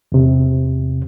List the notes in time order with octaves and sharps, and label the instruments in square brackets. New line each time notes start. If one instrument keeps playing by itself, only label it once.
[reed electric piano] E2 C3